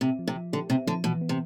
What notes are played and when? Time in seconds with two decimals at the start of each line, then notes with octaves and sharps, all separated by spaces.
0.01 C3 C4
0.19 F3
0.28 C3
0.36 F3
0.53 D3 G4
0.70 C3 C4
0.87 D3 F3
1.04 B2 E3
1.21 B3
1.29 C3